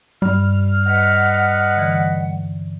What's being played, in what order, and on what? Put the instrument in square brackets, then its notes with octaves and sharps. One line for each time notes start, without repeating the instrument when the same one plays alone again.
[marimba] G2 [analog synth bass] G3 [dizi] F6
[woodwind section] B4 D#5 F#5
[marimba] D3 E3